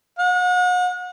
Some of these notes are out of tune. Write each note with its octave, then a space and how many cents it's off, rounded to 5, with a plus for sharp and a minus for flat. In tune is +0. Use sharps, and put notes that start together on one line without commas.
F#5 -40